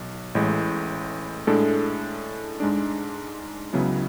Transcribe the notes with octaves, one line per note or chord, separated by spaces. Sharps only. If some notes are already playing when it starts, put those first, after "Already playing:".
Already playing: B1
A1 A2 G#3
A2 G#3 D4 A4
G#2 G#3 D4
C#2 C#3 F#3 B3 E4